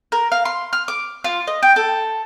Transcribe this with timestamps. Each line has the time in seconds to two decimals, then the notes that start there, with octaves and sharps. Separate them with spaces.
0.12 A#4
0.32 F5
0.45 C6
0.73 F6
0.88 D6
1.24 F4
1.47 D#5
1.63 G5
1.76 A4